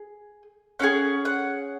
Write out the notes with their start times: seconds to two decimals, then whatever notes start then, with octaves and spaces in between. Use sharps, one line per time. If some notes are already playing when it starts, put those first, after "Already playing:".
Already playing: G#4
0.79 C#4 F4 G#4 F#5
1.25 F#5